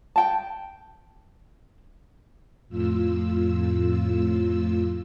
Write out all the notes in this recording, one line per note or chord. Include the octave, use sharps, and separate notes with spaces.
G5 A5
F2 A2 F4 E6